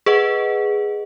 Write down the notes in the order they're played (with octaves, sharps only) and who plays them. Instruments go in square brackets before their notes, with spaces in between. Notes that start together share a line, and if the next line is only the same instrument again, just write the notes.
[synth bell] G#4 B4 D#5 F#5